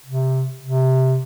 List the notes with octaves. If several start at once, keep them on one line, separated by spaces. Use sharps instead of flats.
C3
C3